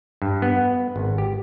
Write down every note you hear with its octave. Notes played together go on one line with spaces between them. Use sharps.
G2
B3
G#1
G4